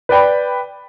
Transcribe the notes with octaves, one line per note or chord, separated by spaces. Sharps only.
B4 D5 G5 B5